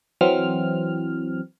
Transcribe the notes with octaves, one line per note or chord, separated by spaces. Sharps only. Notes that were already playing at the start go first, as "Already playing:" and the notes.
E3 F#3 C4 F6